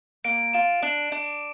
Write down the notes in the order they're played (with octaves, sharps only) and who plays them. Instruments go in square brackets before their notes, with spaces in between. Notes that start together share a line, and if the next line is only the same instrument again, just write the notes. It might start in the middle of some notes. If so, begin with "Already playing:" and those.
[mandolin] A#3 [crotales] D7
[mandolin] F4 [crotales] E7
[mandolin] D4 [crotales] D7
[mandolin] D4 [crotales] D7